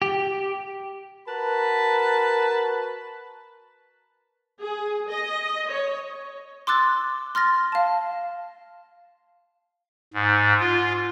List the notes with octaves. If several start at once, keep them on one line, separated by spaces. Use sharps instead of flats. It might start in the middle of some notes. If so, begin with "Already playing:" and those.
G4
F#4 A#4 B4 A5 B5
G#4
D#5
C#5
C6 D6 E6 F#6 A6
C6 F6 A6 A#6
F5 A5
G#2
F4